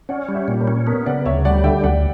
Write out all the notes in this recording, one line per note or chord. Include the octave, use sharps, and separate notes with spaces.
C#4 D5 F#5
G3
C#5 E5
A#2
A#4 C#5
C#4
B3 A#4 C#5
C#3 D5 F#5
D2 C#5 E5
G3 D5 F#5
D3 E5 G5
D2 D5 F#5